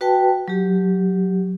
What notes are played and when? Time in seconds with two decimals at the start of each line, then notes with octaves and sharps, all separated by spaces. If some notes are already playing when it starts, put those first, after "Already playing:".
0.01 F#4 B4 G5 A5
0.48 F#3 G4